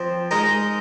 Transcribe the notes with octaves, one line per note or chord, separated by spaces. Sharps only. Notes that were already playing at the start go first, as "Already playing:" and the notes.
Already playing: F3 C4
G#3 D#4 A#4